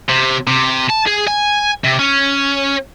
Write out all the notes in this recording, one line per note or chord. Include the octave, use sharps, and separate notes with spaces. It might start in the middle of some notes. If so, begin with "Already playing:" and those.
C3
C3
A5
G#4
G#5
C3
C#4